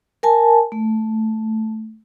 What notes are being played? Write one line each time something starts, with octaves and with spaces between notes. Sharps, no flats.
A#4 G#5 A5
A3